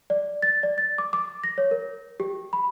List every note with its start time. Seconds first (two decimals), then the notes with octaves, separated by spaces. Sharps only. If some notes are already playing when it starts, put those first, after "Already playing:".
0.10 D5
0.42 A6
0.63 D5
0.78 A6
0.98 D6
1.13 D6
1.44 A#6
1.58 C#5
1.71 A#4
2.20 G4
2.53 B5